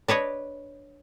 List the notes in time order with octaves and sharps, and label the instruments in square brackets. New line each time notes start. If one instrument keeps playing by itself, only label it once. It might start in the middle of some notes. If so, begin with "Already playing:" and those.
[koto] D4 B4 C#5 D#5